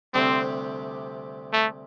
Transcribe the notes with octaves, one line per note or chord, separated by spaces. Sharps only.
D2 C3 G3 C4 D4
A3